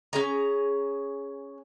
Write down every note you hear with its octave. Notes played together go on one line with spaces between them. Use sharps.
C#4 G#4 A#5